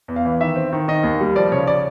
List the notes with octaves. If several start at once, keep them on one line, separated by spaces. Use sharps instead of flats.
E2
F5
E3
D#3 E5
C4
D#3
D#3 D#5
D#2
G3
F3 D5
C#3 C#5
D5